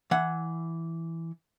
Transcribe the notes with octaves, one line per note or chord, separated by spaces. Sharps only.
E3 F#5